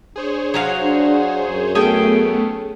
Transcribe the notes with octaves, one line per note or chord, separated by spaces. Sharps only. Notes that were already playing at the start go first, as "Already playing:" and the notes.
D4 G#4 C5 C#5
F#3 F#4 F5
D4
F#2
A3 B3 C#4 G#4 A4 G5